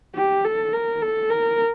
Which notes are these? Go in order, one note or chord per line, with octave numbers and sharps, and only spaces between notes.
G4
A4
A#4
A4
A#4